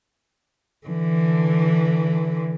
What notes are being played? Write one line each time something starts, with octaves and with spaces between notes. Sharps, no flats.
D3 E3